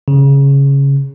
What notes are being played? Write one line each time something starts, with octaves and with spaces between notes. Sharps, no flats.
C#3